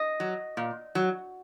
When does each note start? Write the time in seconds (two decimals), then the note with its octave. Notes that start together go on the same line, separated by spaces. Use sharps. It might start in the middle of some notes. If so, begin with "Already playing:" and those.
Already playing: D#5
0.20 F#3
0.57 A#2
0.95 F#3